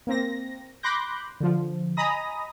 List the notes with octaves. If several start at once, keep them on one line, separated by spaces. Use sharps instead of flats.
A#3 C4 A#6
B5 C6 D6 F#6 G6 A#6
D3 F3
D#5 G#5 A#5 B5 D#6 A#6